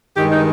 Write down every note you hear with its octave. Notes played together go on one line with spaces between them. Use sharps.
G2 D#3 G#3 G4
D#4